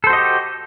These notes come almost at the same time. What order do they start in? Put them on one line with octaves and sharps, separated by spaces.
A4 C5 F#4 D#5 G4